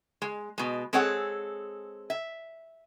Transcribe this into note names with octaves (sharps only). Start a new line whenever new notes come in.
G#3
B2 G#3
G#3 C4 G#4 A4 C#5 F#5
E5